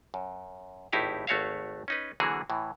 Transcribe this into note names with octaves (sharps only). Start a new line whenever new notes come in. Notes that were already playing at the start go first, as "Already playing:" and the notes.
F#2
G#1 A2 D#4 E4 G4 F5
G#1 A3 F#4 C#5 E5 F5
C#4 D#4 B4
D3 E3 F#3 A#3 F#4 G#4
A2 E3